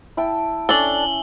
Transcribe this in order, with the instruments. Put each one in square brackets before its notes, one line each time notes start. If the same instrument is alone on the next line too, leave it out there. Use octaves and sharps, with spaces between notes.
[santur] E4 G5 A5
[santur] C#4 [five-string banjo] D4 A4 [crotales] F#7 G7